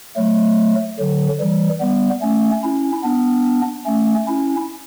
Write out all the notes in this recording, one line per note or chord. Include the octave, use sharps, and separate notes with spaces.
F#3 A3
D3 F#3
E3 G3
G3 B3
A3 C#4
C#4 E4
B3 D4
A3 C#4
C#4 E4